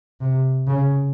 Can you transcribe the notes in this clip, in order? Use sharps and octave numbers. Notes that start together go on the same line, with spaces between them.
C3
C#3